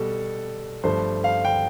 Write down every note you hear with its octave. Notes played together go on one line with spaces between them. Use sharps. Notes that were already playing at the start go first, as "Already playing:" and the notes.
Already playing: B2 G3 A4
G2 F3 A3 C5
F5
G5